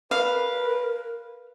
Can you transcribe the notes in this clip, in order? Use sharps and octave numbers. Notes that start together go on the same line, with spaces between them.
A#4 B4 F5